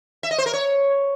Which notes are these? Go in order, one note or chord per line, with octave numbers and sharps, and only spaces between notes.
E5
D#5
C5
A#4
C#5